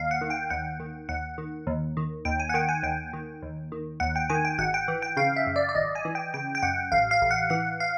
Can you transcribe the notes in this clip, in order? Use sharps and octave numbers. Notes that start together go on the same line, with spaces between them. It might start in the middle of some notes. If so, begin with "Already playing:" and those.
Already playing: D#2 F5
F#5
D#3
G5
D#2 F#5
D#3
D#2 F#5
D#3
D#2
D#3
D#2 G5
G#5
F#5
D#3 G5
G#5
D#2 G5
D#3
D#2
D#3
D#2 F#5
G5
D#3 G#5
G5
G#1 F#5
G5
E3
G5
C#3 F5
E5
F#2
D5
D5
G#1 D#5
G#5
E3
G5
C#3 G5
G5
F#2 F#5
A1 F5
F5
A1
F#5
E3 F#5
F5